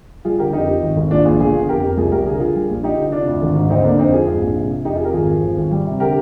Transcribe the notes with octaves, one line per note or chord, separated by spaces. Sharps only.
G3 F4 G#4
D3 G4 A#4
F2 D#4 G4
F3
G#1
G#1
A#1 D4 F4
A#1 F4 G#4
G1 F4 G#4
D3
F2 G4 A#4
F2
C2 F4 G#4
C2 G4 A#4
D3 G#4
A#4
D3 F4 G#4
G3
A#1
F3 D#4 G4
D3
C3 D4 F4
D2
G#1
G#2
D2 C4 D#4
D3 A#3 D4
F2 C4 D#4
F2 F4 G#4
G#2 F4 G#4
A#1
C3
C3
F2 D#4 G4
F4 G#4
F2 G4 A#4
G#1 F4 G#4
F3
G#1
G#1
G3
C3
D3 G4 A#4